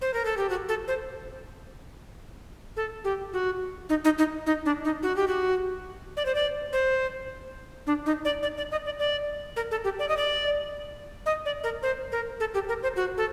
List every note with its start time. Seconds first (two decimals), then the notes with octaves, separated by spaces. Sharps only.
0.01 C5
0.14 A#4
0.25 A4
0.37 G4
0.49 F#4
0.69 A4
0.88 C5
2.77 A4
3.04 G4
3.33 F#4
3.89 D#4
4.05 D#4
4.18 D#4
4.46 D#4
4.66 D4
4.85 D#4
5.03 F#4
5.16 G4
5.28 F#4
6.17 D5
6.26 C5
6.35 D5
6.73 C5
7.87 D4
8.06 D#4
8.25 D5
8.43 D5
8.57 D5
8.72 D#5
8.86 D5
8.99 D5
9.56 A#4
9.71 A4
9.84 G4
9.99 D5
10.09 D#5
10.17 D5
11.26 D#5
11.45 D5
11.64 A#4
11.83 C5
12.12 A#4
12.40 A4
12.54 G4
12.69 A#4
12.83 C5
12.96 F#4
13.18 A4